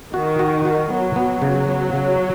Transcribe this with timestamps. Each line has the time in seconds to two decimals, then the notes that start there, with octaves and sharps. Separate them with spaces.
0.13 D#3 F#4
0.39 F#4
0.65 F#4
0.90 F#3 B3
1.16 B3
1.42 C#3
1.68 B3
1.93 C#3